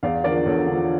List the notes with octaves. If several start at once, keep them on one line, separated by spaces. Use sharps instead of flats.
E2 D5 F5
D3 F3 A#4 D5
E2 A4 C#5
D3
F3